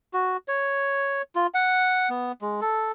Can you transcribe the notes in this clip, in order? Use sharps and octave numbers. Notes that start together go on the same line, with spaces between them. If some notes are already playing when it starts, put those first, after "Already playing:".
F#4
C#5
F4
F#5
B3
G#3
A4